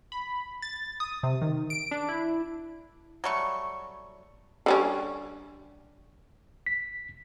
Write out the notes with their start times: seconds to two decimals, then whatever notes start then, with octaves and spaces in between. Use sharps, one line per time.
0.12 B5
0.62 A6
1.00 D#6
1.23 C3
1.42 D#3
1.70 D7
1.91 D4
2.09 E4
3.24 F#3 G3 A3 C#6
4.66 D3 G3 C#4
6.66 B6